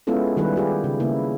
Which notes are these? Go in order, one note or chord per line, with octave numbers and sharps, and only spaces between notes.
G#3 B3 C#4 E4 F4 A4
D#3 G3 E4 B4
F4 G4 G#4
C#3
C#3 A#3 E4